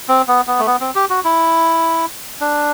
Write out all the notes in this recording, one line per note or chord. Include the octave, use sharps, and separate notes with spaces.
C4
B3
B3
A3
B3
C4
G4
F#4
E4
D4